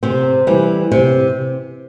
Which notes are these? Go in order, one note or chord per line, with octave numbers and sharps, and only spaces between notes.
C3 C4
E3 G3
C3